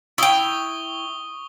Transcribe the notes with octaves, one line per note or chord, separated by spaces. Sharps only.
E4 G5 C#6 D#6 G7